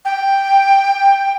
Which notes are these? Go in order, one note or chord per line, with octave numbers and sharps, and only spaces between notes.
G5